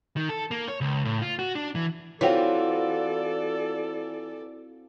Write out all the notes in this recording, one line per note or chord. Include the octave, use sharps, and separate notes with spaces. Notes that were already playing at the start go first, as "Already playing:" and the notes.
D#3
A4
A#3
C#5
C#2
A2
F4
F#4
D4
E3
E3 C4 F4 F#4 A4 C#5 D5 G5